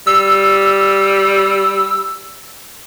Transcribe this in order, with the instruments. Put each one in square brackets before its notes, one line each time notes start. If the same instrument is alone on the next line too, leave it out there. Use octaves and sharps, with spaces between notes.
[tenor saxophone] G3 [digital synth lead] E6